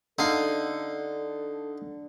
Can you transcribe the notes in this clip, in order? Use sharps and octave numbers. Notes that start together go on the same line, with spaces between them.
D3 D#4 A4 F5